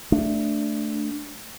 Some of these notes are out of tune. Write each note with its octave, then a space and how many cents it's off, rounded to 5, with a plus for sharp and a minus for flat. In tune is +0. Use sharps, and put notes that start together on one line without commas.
A3 +5 D4 +0